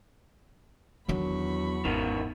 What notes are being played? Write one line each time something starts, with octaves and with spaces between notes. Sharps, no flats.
E2 D#3 F#3 D4 B5 C#6
G#1 B2 D#3